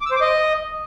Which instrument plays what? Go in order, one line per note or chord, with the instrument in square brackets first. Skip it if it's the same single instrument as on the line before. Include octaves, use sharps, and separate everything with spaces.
[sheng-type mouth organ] D6
E6
C5
D6
D#5